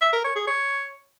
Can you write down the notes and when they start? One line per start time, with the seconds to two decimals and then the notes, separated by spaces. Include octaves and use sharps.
0.02 E5
0.13 A#4
0.24 C#5
0.36 G#4
0.47 C#5